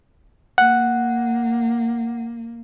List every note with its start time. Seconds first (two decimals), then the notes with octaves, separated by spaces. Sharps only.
0.58 A#3 F#5